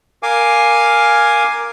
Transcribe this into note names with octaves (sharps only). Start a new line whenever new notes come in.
A#4 F5 G#5 D6